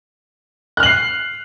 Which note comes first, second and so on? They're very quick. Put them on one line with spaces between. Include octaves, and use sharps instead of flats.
F#6 F6 F#7 C7